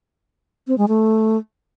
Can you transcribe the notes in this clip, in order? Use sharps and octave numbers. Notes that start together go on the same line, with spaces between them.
C4
G#3
A3